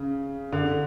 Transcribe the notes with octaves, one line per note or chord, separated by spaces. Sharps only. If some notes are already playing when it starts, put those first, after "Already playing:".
Already playing: C#3
D3